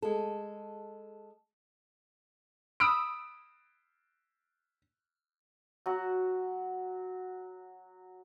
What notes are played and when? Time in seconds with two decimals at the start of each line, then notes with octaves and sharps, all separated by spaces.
0.02 G#3 A4
2.80 B5 D#6 E6 D7
5.86 F#3 F#4